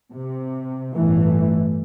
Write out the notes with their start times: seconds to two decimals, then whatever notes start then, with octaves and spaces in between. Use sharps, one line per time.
0.12 C3
0.94 G1 A2 E3 A3